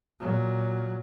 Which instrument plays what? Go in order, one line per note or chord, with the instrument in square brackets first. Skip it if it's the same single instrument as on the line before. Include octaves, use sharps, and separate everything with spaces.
[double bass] A#2 F#3